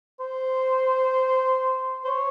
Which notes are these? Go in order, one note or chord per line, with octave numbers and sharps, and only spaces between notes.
C5
C5
C#5